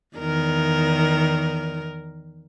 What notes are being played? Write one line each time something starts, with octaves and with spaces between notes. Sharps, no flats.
E2 D#3 A#4